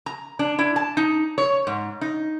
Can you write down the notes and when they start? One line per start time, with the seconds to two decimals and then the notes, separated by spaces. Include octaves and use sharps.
0.06 A#5
0.39 D4
0.59 E4
0.76 A5
0.97 D#4
1.38 C#5
1.67 G#2
2.01 D#4